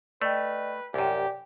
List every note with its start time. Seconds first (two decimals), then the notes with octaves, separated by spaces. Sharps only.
0.22 A3 B4 D5 D#5 G5
0.94 C2 F#2 G4 D5 G5 G#5